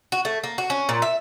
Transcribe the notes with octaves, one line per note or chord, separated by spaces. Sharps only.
F#4
A3
A#3
F#4
C#4
A#2
E5